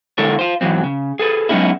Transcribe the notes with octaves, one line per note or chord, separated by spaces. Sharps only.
D3 G#3 E4 A4 A#4 C#5
F4 C5
G#2 B2 E3 F#3 C4
C#3
G#4 A4 B4
F#3 G#3 B3 C#4 D#4 E4